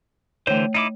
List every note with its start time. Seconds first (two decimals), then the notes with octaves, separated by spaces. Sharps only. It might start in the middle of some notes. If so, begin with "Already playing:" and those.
0.47 D3 E3 A3 C5 C#5
0.74 D#4 E4 D6